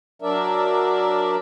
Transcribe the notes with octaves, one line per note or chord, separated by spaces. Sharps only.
F#3 D4 A#4 D5 E5